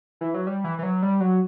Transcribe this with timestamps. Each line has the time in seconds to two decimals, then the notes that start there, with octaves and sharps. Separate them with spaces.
0.21 E3
0.34 F#3
0.47 G3
0.64 E3
0.79 E3
0.83 F#3
1.03 G3
1.20 F#3